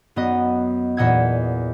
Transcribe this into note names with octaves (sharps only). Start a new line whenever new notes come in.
F#2 B3 F#4 D#5
E2 A#2 D#5 F#5 E6 G#6